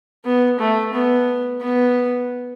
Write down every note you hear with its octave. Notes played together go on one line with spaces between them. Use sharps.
B3
A3
B3
B3